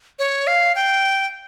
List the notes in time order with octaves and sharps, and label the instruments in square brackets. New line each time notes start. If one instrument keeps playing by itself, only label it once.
[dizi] C#5
F5
G5